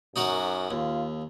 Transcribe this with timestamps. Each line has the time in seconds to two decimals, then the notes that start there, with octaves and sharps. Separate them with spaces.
0.16 F#2 D#4 F#4 A#4
0.71 D#2 F4